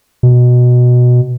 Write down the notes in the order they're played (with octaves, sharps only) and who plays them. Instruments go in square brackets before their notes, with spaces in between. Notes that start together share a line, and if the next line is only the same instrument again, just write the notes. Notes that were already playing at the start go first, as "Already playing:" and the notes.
[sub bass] B2